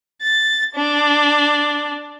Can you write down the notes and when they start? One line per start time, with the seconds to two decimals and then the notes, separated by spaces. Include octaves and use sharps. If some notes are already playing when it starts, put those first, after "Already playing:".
0.22 A6
0.76 D4